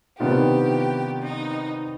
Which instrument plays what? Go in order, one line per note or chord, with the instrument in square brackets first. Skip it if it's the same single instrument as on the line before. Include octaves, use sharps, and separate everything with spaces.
[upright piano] C3 D#3 B3 D4 F4 [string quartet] G4
[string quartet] D#4